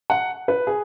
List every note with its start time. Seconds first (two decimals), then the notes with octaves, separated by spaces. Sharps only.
0.10 F#5
0.48 B4
0.67 G#4